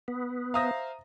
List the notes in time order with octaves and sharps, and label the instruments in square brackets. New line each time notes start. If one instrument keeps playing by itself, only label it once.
[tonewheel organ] B3
[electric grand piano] C5 E5 F5 [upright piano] A#5 D#6 A#6